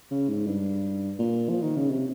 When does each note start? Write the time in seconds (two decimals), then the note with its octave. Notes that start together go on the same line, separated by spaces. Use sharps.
0.11 C#3
0.29 G#2
0.47 G2
1.19 A#2
1.49 F3
1.63 D#3
1.77 C#3
1.90 C3